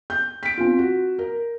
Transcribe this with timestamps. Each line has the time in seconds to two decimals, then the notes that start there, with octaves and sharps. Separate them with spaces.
0.10 G6
0.43 B6 D7
0.57 C4 F4
0.79 F#4
1.19 A#4